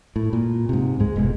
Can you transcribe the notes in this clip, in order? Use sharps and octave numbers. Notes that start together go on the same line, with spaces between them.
A2
A#2
G#2 C3
C#2 G#2 G#3
F1 B2 G#3